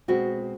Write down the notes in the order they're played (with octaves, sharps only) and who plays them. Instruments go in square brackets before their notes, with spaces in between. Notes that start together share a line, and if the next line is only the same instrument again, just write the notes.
[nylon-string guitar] B2 G#3 C4 F#4